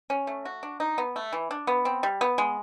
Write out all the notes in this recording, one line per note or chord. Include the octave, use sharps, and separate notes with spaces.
C#4
A3
F#4
D4
D#4
B3
A3
E3
D4
B3
C4
G3
B3
G#3